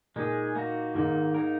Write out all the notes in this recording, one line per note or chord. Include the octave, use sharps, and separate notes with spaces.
A#2 G#3 D#4 G#4
A#3 D#4 F#4
G#2 D#3 A#3 D#4
A#3 D#4 A#4